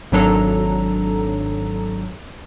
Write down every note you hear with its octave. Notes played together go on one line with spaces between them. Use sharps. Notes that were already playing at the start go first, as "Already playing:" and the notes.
G#1 G#2 F#3 D4 A4 A#5